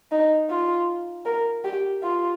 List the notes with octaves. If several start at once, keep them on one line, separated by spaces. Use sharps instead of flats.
D#4
F4
A#4
G4
F4